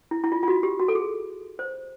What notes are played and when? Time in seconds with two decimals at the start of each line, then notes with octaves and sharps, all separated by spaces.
0.11 E4
0.24 E4
0.32 F4
0.43 F4
0.48 F#4
0.63 G4
0.80 F#4
0.88 A4
0.95 G#4
1.59 C5